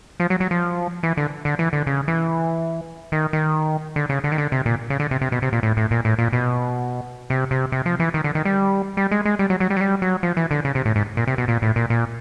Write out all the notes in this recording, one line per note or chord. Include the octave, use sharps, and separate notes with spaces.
F3
F#3
F#3
F3
E3
D3
D3
E3
D3
C#3
E3
D#3
D#3
D3
C#3
D3
D#3
D3
C3
A#2
C#3
D3
C3
C3
B2
C3
A#2
A2
A2
A#2
A2
A#2
B2
C3
C3
C3
F3
E3
D#3
D3
D#3
G3
G3
G#3
G#3
G3
F#3
F#3
G3
F#3
G3
F#3
F3
E3
D3
C#3
C3
A2
G#2
A#2
C3
B2
A#2
A2
A#2
A#2